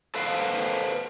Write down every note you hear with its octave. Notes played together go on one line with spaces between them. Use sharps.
A4 B4 C5 F5